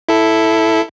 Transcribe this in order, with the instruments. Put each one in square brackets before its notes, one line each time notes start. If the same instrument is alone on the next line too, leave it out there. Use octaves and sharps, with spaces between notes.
[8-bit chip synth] E4 A4